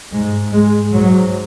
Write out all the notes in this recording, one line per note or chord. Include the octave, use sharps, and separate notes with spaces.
G#2 G#3
G#3
G#2 F#3